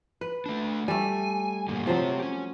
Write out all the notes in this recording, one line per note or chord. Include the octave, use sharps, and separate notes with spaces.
B4
A3 D4
G3 A3 G#5
G2 A#2 D3
F3 F#3 C4 G4
C#4